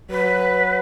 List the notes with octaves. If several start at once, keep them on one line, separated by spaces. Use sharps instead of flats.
F#3 B4